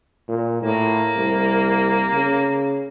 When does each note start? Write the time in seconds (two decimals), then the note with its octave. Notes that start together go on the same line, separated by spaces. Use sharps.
0.28 A#2
0.62 A2 A#3
1.17 C2
2.13 C#3